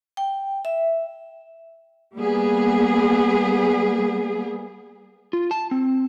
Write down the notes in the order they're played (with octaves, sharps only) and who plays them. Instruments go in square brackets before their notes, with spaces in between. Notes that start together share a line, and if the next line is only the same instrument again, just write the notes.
[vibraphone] G5
E5
[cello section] G3 A#3 B3 G#4
[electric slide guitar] F4
A5
C4